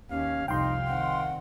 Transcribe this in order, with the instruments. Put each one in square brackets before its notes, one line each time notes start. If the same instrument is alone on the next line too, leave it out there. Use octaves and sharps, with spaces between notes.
[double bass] D#2 [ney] C#4 [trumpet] F5
[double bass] C2 F2 [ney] D#4 [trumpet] F5 [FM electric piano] G5 C6
[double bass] D#3 C4 [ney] F#5